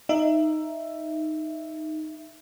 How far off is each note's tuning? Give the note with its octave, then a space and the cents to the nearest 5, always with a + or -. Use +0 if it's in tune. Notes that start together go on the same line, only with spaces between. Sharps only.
D#4 +0 E5 +10